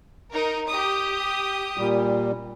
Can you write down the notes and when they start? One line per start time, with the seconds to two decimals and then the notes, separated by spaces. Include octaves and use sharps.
0.31 D#4 A#4
0.68 G4 D#6
1.78 A#2 G3